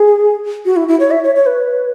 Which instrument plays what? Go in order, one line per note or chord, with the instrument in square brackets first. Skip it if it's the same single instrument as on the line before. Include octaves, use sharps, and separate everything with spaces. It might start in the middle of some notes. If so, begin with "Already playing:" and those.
Already playing: [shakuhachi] G#4
F#4
E4
E4
C#5
E5
C#5
C#5
B4